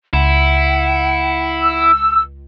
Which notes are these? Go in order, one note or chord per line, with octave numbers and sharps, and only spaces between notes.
C#2 E4 F#5
E6